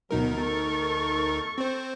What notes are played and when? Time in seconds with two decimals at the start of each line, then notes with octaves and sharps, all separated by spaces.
0.11 D2 B2 F#3 D#4 A#4
0.41 A4 C#6
1.58 C4 C5